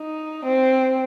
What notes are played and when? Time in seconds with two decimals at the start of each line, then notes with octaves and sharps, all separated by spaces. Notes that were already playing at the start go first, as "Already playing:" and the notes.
Already playing: D#4
0.45 C4